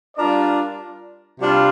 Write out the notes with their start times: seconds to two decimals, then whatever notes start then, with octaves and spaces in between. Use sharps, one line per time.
0.16 G3 D4 F4 A#4 D5
1.39 C3 G3 D4 F4